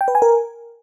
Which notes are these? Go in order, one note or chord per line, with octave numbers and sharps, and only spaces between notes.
G5
B4
G#5
A#4